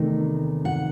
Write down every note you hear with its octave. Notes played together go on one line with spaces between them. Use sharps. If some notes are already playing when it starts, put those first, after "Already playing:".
Already playing: E2 C3 D#3 A3 D#4
F#5